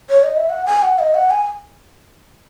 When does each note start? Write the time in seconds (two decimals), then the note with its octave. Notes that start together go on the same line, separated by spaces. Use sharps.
0.09 C#5
0.23 D#5
0.37 E5
0.49 F#5
0.66 G#5
0.82 F#5
0.99 D#5
1.14 F#5
1.30 G#5